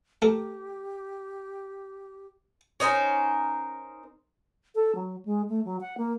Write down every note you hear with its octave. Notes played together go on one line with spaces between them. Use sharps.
A3 G4 A4 A#4
C#4 D#4 A#4 C5
A4
F#3
G#3
A3
F#3
F#5
A#3